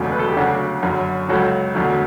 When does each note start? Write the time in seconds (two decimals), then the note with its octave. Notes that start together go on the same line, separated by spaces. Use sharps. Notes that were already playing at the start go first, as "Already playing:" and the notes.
Already playing: E1 D2 C#3 F#3
0.12 B4
0.19 A4
0.28 G4
0.36 D2 C#3 F#3 D4 F#4
0.83 F#1 F#2 D3 F#3
1.29 C#2 C#3 F#3 F#4 A4
1.75 E1 D2 D3 F#3